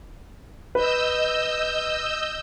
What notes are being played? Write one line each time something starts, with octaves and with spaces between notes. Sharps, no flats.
B4 D#5 E6 G6